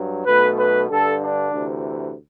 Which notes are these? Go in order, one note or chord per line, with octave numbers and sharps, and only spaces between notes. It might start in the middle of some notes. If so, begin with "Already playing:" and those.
Already playing: G2 F#3
B1 B2 A3 B4
B4
G2 D3 G3 A4
D4
D2 C3 E3